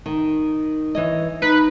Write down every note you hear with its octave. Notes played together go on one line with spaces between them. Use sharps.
D#3
E3 C#5 D#5
D#4 B4